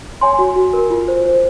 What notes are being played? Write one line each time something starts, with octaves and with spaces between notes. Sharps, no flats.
C#5 G#5 C6
F#4
F#4
A#4
F4
C5
C5